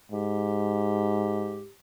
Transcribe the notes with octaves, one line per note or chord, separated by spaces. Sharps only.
G#2 G4